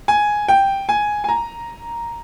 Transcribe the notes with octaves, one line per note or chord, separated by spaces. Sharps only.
G#5
G5
G#5
G#5
A#5